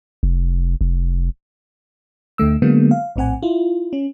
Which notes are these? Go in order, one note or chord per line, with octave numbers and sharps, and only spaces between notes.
F1
F1
D2 D3 A3 E6
D3 F#3 G#3 A#3 B3
F5
A#1 A2 C4 F#5 G#5
E4 F4
C#4